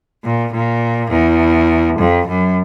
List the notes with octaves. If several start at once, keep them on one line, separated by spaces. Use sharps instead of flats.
A#2
A#2
E2
F2
F#2